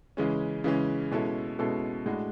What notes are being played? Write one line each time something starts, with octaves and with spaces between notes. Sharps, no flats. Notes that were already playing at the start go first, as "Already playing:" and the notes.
C#3 E3 G#3 C#4
C#3 E3 G#3 C#4
B2 G#3 C#4 E4 A4
B2 G#3 C#4 E4 A4
A2 G#3 D4 F#4